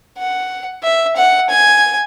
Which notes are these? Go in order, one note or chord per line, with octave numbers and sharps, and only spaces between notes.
F#5
E5
F#5
G#5